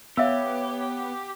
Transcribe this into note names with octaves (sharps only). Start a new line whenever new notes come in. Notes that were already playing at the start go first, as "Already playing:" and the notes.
B3 G4 C#5 E5 F5 E6